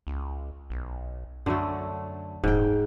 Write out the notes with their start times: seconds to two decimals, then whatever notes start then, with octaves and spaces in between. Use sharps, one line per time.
0.07 C#2
0.70 B1
1.46 F#2 D3 F#3 A3
2.44 D#1 G#2 G5